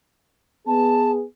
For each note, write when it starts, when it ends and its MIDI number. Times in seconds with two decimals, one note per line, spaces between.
0.67 1.23 59
0.67 1.23 68
0.67 1.11 81